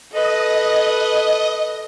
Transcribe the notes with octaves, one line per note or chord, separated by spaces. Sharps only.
A4 B4 D#5